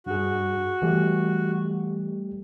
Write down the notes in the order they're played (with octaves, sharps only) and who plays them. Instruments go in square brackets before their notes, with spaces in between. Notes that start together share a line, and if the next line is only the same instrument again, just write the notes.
[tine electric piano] G2 G#4 [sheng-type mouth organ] F#4
[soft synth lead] E3 [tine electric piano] G3 A3 G4